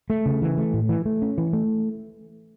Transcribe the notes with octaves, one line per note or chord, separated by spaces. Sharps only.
A3
C#3
E3
A3
A2
E3
A3
C#4
E3
A3